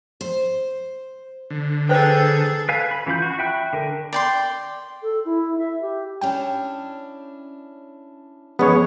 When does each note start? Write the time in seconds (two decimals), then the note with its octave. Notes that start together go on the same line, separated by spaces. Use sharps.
0.21 C5
1.50 D3
1.89 G#4 A4 B4 C5 G5 A#5 F#6
2.69 B4 F5 G#5
2.91 B5
3.06 E3 C#4 F4 B5 G6
3.22 F#4
3.39 E5 G5 B5 F#6
3.73 D3 A#4
4.13 D5 G5 C6
5.03 A4
5.25 E4
5.58 E5
5.81 G4
6.21 C#4 D4 E4 G5
8.59 E2 G2 F3 G#3 B3 C#4 G#4 C#5